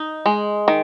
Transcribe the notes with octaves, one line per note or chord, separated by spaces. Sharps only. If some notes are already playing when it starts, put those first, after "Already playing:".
Already playing: D#4
G#3
D#3